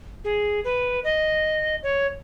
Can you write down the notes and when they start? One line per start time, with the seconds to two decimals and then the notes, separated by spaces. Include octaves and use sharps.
0.24 G#4
0.64 B4
1.04 D#5
1.83 C#5